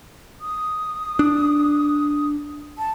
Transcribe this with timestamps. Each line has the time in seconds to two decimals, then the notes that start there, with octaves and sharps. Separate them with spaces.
0.41 D#6
1.19 D4
2.78 A5